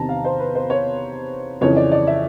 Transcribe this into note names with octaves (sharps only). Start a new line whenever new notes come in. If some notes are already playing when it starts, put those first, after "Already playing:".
Already playing: E2 C3 D#3 A5 A#5
F5
C5
B4
C5
C#5
F2 C#3 E3 C#5
D5
D5
E5